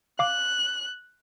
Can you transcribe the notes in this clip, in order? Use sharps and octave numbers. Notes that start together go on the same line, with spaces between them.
F5 D6 F#6